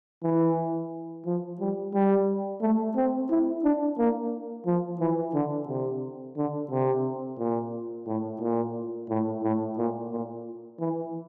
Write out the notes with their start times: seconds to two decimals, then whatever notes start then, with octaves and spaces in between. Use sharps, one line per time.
0.23 E3
1.26 F3
1.60 G3
1.94 G3
2.62 A3
2.96 C4
3.30 E4
3.64 D4
3.99 A#3
4.66 F3
5.00 E3
5.34 D3
5.68 C3
6.38 D3
6.71 C3
7.39 A#2
8.07 A2
8.41 A#2
9.10 A2
9.43 A2
9.78 A#2
10.12 A#2
10.80 E3